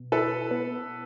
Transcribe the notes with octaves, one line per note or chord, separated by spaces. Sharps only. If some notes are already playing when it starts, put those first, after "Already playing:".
Already playing: B2
E4 A4 B4
B3